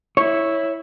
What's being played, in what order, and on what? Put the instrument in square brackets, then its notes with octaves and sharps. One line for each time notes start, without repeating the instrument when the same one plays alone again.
[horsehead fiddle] E4 [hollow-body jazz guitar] C#5 [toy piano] C#6